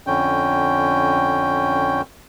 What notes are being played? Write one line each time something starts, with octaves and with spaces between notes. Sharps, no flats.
F2 D3 C#4 G5